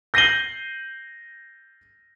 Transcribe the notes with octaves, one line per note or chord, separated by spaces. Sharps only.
G6 A#6 C7 D#7 F#7 G7